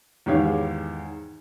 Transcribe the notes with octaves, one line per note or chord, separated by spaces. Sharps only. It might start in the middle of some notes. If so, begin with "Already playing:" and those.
E2 G#2 D#3 G4 C#5 F5